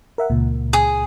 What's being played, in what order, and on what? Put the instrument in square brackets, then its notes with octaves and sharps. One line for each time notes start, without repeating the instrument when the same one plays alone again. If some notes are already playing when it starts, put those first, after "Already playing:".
[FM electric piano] A#4 E5 F#5
C#2 A#2
[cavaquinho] G#4